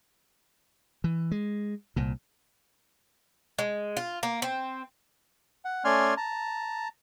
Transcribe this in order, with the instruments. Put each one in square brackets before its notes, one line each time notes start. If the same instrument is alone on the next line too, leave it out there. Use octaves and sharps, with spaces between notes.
[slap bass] E3
G#3
C2 A#2
[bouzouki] G#3
F4
A#3
C4
[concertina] F#5
A3 C#4 D5 G#5 C6 F6
A5 A#5